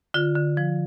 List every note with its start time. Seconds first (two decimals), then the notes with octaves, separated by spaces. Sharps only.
0.14 D3 F4
0.36 D3
0.57 F3